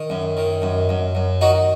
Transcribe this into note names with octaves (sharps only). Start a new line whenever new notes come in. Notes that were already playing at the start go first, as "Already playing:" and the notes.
Already playing: D#3
F#2
D#3
F#2
F#2
F#2
D#3 D#4 F#4